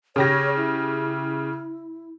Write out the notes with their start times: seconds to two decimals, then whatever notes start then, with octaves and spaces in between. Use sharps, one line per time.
0.16 C#3 G4 C#5 A#6
0.57 E4